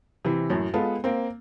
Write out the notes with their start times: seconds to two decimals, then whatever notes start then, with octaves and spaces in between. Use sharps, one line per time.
0.25 C3 E3
0.50 F#2 A2
0.74 G#3 B3 F4 A4
1.04 A#3 C4